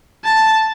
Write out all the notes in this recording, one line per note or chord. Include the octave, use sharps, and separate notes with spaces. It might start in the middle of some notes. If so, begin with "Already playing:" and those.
A5